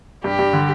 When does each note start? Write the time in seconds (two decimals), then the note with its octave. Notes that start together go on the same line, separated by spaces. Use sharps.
0.24 G2 G4
0.39 G2
0.53 D3